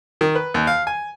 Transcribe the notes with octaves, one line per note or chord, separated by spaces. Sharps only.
D#3
B4
D#2
F5
G#5